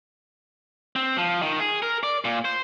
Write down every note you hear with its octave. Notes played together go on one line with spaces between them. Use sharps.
C4
F3
D#3
G#4
A#4
D5
A#2
C5